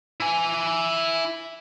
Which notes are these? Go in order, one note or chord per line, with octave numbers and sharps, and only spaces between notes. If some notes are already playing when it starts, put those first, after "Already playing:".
E4 G#5